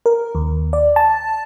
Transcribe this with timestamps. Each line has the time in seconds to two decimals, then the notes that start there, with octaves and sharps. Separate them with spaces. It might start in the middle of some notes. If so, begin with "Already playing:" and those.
0.06 A#4
0.35 D#2
0.73 D5
0.96 A5